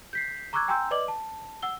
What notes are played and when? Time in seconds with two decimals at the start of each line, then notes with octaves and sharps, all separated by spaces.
0.13 G6 B6 C7
0.53 A#5 C#6 D6 E6 F#6 G#6
0.68 G5 G#5 A#5 C6 E6 G6
0.91 B4 D5 D#5 D6 F#7
1.08 A5
1.62 F#5 E6 G7